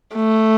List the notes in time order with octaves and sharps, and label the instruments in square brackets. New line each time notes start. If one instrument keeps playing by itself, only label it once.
[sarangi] A3